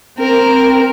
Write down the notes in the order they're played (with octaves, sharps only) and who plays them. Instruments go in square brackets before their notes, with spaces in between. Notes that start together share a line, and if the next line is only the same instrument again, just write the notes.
[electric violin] C4 A#4